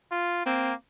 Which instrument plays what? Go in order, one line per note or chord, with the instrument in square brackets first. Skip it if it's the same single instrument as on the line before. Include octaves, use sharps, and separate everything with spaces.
[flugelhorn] F4
[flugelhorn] A#3 [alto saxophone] C4